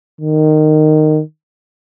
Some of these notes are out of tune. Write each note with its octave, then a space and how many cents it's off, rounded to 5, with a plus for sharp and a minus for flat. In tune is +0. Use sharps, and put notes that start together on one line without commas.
D#3 -15